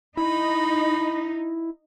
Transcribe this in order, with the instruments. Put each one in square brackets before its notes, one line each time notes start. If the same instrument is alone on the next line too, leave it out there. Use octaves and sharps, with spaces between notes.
[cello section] D#4 [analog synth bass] E4 [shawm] B5